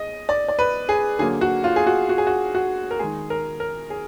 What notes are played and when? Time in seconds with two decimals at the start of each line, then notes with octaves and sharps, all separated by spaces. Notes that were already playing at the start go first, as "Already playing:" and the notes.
Already playing: G#3 D#5
0.29 D5
0.48 D5
0.59 B4
0.89 G#4
1.19 D3 F#3 A#3 G#4
1.41 F#4
1.64 F4
1.76 G#4
1.87 F#4
2.09 F#4
2.18 G#4
2.27 F#4
2.55 F#4
2.91 A#4
2.99 D#3 G#3 G#4
3.30 A#4
3.60 A#4
3.90 G#4